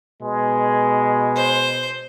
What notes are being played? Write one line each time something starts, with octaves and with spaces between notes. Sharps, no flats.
B2 G#3
C5